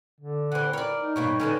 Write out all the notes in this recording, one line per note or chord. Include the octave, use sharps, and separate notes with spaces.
D3
E3 C4 F#5
A#4 C#5 D5
D#4
G2 B2 A#3 C#5
D3 D#3 B3 C#4